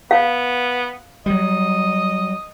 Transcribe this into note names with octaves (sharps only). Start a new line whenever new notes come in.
B3 F5
F#3 G3 D#5